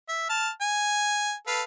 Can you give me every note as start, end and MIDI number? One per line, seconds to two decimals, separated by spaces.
0.09 0.26 76
0.29 0.49 81
0.29 0.49 89
0.61 1.34 80
1.47 1.62 69
1.47 1.62 71
1.47 1.62 77